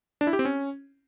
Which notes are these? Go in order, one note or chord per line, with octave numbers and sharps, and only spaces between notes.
D4
E4
G4
C4
C#4